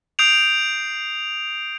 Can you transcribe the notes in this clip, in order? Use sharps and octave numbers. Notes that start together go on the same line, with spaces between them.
D#6 G6 C7 D7 F7